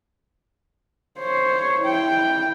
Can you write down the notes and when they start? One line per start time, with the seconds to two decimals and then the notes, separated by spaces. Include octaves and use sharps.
1.19 C5 C#5
1.80 E4 G5